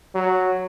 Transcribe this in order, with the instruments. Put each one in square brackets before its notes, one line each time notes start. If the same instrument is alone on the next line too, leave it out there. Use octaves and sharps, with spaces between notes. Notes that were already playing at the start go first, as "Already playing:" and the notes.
[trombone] F#3